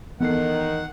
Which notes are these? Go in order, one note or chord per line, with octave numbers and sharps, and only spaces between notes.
D#3 E3 B3 A4 F#5 C7